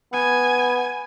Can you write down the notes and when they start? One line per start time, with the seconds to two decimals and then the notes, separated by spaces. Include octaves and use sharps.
0.13 B3 G#5